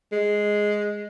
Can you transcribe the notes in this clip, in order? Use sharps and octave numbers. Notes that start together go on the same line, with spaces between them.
G#3